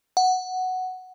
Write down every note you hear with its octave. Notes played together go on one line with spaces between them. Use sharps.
F#5